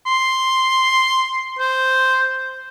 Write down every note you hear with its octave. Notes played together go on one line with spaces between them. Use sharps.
C6
C5